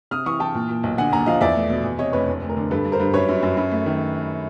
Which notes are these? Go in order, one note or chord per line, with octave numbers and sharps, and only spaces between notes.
C3 D#6 F6
E3 C#6 D#6
E3 G5 A5
A#2
A#2
B1
D3 F#5 G#5
D#2 G#5 A#5
F3 D#5 F5
E2 D5 E5
A3
B2
E2
C3 C#5 D#5
F1 B4 C#5
D2
D2
A#4
D3
G2 A4 B4
G2
A#4 C5
G2
F#2 B4 C#5
F#2
F#2
F#2
A3
D#3